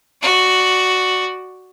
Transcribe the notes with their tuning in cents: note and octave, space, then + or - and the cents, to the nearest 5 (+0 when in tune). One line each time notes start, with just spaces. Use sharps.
F#4 +5 D5 +15